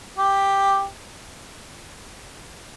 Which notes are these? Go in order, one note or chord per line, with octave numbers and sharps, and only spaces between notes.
G4